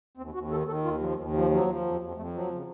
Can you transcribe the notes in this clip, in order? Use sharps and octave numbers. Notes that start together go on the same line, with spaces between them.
D#2 C4
D#2 F#4
D#3 A4
D#3 A4
D#2 F4
F3 F#3
D#2 F3
F3 F#3
F3 F#3
F3
F2
F2
F2 A3
F3 F#3
C#3